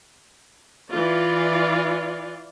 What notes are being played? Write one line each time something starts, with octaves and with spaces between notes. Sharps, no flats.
E3 F4 D5